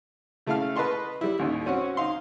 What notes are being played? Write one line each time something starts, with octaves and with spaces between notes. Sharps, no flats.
C#3 A3 E4 A4 F5 F6
B4 D#5 A5 C6 C#6
G3 E4
A1 D#2
C4 C#4 F#4 C#5 F#5
D#4 F5 C6